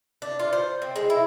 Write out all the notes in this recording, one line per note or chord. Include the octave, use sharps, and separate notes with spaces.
D4
F4
C5
C4
G#3
E4